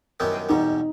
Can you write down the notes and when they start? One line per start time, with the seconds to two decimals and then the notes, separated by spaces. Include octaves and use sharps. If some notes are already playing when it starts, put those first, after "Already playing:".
0.20 F#2 D#3 G3 B3 E4
0.49 E2 B2 G3 D#4